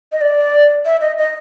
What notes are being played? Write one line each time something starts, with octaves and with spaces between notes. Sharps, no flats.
D#5
D5
E5
D#5
D#5